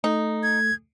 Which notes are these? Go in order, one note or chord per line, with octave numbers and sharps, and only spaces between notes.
A3 D#4 A4
G#6